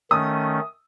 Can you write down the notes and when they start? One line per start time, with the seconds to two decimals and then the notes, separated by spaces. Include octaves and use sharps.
0.11 D#3 A3 C#4 D#6